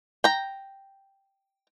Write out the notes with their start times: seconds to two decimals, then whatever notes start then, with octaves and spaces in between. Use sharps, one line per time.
0.24 G5 A#5